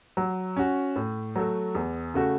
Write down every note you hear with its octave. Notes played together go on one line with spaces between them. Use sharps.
F#3
C#4 F#4
A2
F#3 A3 F#4
E2
C#3 A3 F#4